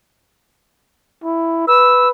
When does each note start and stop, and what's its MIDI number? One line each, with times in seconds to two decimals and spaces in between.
1.24 1.64 64
1.68 2.11 71
1.68 2.08 88